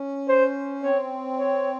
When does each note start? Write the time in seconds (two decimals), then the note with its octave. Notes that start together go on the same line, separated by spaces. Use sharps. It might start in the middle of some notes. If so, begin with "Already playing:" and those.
Already playing: C#4
0.28 C5
0.83 C4 C#5
1.38 C#5